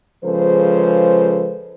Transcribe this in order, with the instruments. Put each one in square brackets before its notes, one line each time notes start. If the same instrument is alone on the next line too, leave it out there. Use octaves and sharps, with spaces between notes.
[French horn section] C#3 F3 G#3 A4 B4 C5